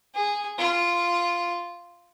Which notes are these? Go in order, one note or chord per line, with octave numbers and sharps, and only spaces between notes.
G#4
F4